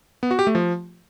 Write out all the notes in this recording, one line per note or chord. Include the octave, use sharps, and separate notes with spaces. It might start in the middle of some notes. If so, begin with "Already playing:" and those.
B3
F#4
G4
A3
F3